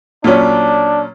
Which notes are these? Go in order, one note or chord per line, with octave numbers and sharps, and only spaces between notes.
A#2 F#3 C#4 D4